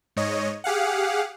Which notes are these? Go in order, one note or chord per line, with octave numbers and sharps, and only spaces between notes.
G#2 C#5 D#5
G4 G#4 F5 F#5